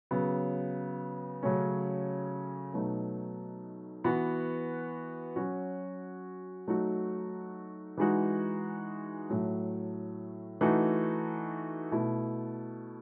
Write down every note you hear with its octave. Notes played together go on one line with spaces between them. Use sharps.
C#3 F#3 B3
C#3 F#3 A3 C#4
B2 F#3 A3 D#4
E3 B3 F#4
F#3 C#4 F#4
F#3 A3 D#4 F#4
E3 G#3 D#4 F#4
A2 F#3 A3
E3 A3 D#4 F#4
B2 A3 E4